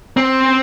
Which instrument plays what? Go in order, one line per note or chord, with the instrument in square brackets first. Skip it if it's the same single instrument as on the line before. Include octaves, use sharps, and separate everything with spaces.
[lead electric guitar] C4